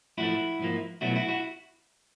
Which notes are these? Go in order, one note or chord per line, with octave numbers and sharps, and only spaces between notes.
A2 F3 A3 E4 F#4
G#2 F3 A#3
B2 F#3 A3 E4 F#4
E4 F#4
E4 F#4